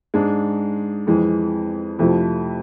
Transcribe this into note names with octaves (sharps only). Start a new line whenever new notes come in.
G#2 G#3 D4
F2 E3 G#3
F2 C3 F3 A3 E4